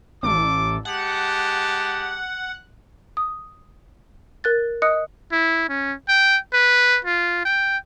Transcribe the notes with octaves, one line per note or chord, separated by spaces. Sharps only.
A1 A4 D6
G#3 G4 F#5 A5
D#6
A#4 F#6 A6
D#5 D#6 F#6 C#7
E4
C#4
G5
B4
F4
G5